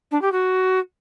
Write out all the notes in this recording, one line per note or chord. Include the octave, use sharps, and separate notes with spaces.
D4
G4
F#4